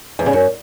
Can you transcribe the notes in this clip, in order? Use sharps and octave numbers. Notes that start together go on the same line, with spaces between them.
E2
C#3
F#2